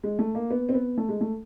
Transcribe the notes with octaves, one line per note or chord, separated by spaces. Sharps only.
G#3
A3
A#3
B3
C4
B3
A3
G#3
A3